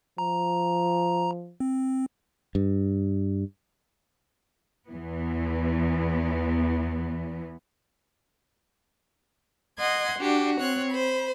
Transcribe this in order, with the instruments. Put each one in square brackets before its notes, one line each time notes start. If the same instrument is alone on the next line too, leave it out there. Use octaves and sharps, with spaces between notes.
[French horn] F3 [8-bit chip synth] A#5
[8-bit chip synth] C4
[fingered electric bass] G2
[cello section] E2 E3 B3
[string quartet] D#5 F#5 C6 G#6
D4 F#4 G4
C4 C#5 F#6
C5 B5